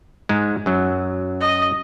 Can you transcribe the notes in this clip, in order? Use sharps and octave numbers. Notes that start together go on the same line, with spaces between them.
G#2 G#3
F#2 F#3
D#5